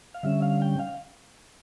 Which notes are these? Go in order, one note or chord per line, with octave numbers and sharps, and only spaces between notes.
F5
D3 G3 C#4 E5
F5
G5
F5